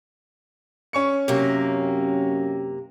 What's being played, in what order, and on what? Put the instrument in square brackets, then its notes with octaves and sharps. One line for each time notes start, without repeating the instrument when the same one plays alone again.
[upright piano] C#4 C#6 C#7
[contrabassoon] F#2 [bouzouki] C3 A#3